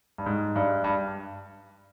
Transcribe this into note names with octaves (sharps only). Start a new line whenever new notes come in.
G2
G#2
G2
G2